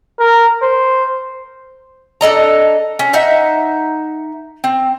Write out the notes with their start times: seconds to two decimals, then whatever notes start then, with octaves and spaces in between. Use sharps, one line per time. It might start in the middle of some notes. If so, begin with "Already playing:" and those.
0.19 A#4
0.62 C5
2.21 D4 A4 D#5 A#5
2.99 C#4
3.13 D#4 E5 F#5
4.64 C4